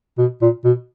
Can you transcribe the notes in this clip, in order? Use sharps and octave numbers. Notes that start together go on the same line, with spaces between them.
B2
A#2
B2